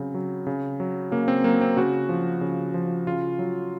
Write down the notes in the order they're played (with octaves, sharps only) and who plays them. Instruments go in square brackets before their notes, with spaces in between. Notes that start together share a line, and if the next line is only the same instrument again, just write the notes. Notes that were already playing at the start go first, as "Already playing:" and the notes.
Already playing: [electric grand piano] C#3 F#3 C4
F#3
C#3
F#3
C#3 A#3
C4
F#3 A#3
C4
C#3 F#4
F3
C#3
F3
C#3 F4
F#3